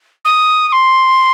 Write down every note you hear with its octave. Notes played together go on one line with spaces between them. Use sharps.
D#6
D#6
C6